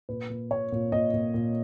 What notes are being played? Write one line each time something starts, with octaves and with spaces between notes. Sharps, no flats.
A#2 B4
A#2
A#2 C#5
A#2
A#2 D#5
A#2
A#2